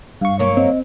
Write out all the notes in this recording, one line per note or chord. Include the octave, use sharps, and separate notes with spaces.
G2 F5 C#6
F#3 A#3 C#4 C#5
C4 D#5